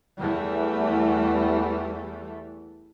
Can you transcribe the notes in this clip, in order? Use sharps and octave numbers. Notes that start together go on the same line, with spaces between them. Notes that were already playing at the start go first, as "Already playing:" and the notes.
E2 E3 G3 A3